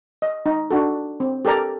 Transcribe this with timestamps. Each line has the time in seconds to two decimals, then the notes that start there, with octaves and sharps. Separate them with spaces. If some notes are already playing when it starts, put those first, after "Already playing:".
0.22 D#5
0.46 D#4
0.71 D4 F#4 A4
1.20 C4
1.45 G4 A4 A#4 D5 A#5